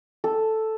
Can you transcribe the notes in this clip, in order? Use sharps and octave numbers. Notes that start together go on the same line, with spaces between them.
A4